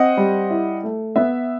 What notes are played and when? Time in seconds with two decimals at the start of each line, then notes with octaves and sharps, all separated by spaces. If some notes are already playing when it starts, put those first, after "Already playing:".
Already playing: C4 D#5 F#5
0.17 G3
0.50 E4
0.84 A3
1.16 B3 E5